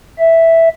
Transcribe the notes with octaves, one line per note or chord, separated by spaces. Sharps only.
E5